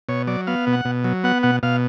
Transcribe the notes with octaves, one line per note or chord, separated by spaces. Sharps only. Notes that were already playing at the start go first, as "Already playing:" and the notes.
B2 C#5
F#3 D5
B3 F5
B2
F#5
B2
F#3
B3 F#5
B2 F#5
B2 F5